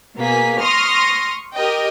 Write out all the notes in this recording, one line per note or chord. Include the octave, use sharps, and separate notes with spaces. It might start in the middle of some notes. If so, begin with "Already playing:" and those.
B2 A#3 G#4 B6
C6 C#6 D#6 F6 A#6
G4 A#4 D#5 G5